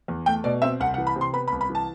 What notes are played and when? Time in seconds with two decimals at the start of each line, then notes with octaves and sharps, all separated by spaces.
0.08 E2
0.26 A3 G5
0.44 B2 D5
0.62 C4 E5
0.80 C2 F#5
0.94 F#5
0.98 E3
1.07 B5
1.16 C3
1.21 C6
1.33 B3 B5
1.48 B5
1.52 C2
1.61 B5
1.70 E3
1.75 A5